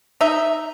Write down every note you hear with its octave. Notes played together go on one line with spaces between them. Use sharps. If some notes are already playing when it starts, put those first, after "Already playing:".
D#4 E5